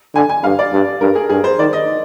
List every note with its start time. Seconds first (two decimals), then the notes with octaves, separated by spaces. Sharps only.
0.15 D3 G#5
0.29 G#5
0.44 G2 F5
0.59 D5
0.73 G2
1.01 G2 A#4
1.15 G#4
1.29 G2 G#4
1.44 C5
1.59 D#3 D5
1.73 D#5